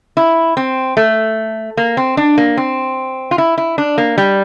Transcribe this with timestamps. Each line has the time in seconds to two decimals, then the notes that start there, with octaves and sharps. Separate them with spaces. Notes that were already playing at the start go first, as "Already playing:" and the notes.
0.17 E4
0.57 C4
0.97 A3
1.77 A#3
1.97 C4
2.17 D4
2.38 A#3
2.57 C4
3.31 F4
3.38 E4
3.58 E4
3.78 D4
3.98 A#3
4.18 G3